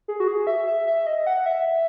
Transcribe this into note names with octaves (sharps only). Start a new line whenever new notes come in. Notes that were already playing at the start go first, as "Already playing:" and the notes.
G#4
F#4
G#4
E5
E5
E5
D#5
F#5
E5